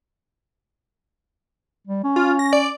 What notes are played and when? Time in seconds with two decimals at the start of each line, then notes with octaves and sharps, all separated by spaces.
1.87 G3
2.04 C#4
2.16 F4
2.39 A#6
2.53 D5